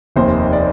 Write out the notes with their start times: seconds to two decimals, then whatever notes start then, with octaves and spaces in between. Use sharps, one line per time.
0.16 F1 D#2 D#3 C5
0.53 D5